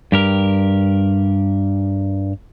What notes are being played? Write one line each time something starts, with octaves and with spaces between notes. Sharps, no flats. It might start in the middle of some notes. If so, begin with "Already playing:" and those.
G2 G4 A#4